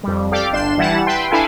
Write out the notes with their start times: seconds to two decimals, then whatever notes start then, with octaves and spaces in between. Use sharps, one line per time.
0.03 F2 G3
0.31 G4 A4 D5 F5 G5 D6
0.53 G1 D4 C6 E7
0.78 E3 G3 E4 F#5 A5 E7
1.07 B4 E5 G5 C6
1.31 D4 E4 A4 E5 F5 G#5